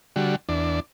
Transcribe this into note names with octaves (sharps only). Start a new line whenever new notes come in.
D3 G3 F#4
E2 D4